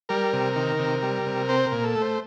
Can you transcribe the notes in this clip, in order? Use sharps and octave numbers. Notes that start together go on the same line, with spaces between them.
G3 A#4
C3
D#3
C3
G3
C3
C4 C5
A#4
A#2
A4
A3
C5